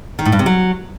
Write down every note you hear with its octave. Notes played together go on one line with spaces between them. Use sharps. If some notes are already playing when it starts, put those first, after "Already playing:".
D#3
A2
G2
C3
F#3